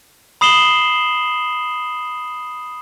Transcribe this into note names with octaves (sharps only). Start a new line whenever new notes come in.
B5 D#6 C7 E7 F#7 G7